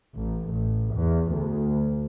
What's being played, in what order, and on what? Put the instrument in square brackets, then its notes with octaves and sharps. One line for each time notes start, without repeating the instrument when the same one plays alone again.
[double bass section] A1
A1
E2
D2